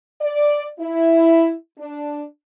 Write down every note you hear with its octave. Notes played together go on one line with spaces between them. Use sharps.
D5
E4
D4